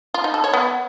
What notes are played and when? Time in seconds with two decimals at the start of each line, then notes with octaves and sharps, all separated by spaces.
0.14 F4
0.24 D#4
0.34 A4
0.44 C#5
0.54 B3